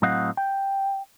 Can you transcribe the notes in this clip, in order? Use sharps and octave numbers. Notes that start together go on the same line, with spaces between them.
A2 F#3 C4 D#5 F5 F#5
G5